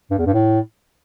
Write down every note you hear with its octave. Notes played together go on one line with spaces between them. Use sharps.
G2
E2
G2
A2